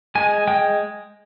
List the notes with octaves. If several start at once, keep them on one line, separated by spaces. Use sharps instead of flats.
G#3 G#5
G#3 G5